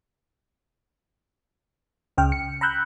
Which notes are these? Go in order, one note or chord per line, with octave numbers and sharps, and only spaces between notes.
C#2 C#3 G5 F6
C#7
A#5 B5 E6 F#6 G6